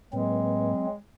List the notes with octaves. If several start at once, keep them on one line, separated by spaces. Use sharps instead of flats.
A2 F#3 G#3 A#3 C4 B4